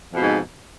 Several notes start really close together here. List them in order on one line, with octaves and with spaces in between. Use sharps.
F2 B2 G#2